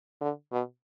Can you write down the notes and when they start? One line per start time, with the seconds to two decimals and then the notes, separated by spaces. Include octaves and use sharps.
0.21 D3
0.52 B2